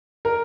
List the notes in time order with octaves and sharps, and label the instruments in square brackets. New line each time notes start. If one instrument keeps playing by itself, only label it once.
[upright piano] A#4